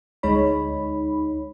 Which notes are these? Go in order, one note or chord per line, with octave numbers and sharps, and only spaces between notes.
D2 G#3 D#4 C#5 B5